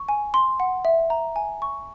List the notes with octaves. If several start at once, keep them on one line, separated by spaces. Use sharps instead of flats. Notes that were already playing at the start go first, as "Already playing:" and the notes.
Already playing: C#6
G#5
C6
F#5
E5
A#5
G#5
C#6